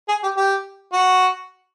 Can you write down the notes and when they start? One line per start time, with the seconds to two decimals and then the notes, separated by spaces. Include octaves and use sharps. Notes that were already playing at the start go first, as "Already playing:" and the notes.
0.09 G#4
0.23 G4
0.37 G4
0.93 F#4